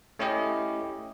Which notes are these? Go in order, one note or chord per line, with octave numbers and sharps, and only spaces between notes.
A3 C#4 E4 G4 D#5